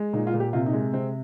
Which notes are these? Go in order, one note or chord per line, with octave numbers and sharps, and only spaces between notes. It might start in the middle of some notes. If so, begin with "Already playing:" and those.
Already playing: G#3
A#2 D#4
F4
A#2
G4
C3 F4
D#4
G#3
C3 C4